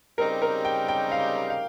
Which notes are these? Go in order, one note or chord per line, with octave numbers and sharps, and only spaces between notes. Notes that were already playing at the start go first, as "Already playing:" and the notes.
C#3 G3 C4 D#4 G4 A#4
A#4
G5
G5
F5
F5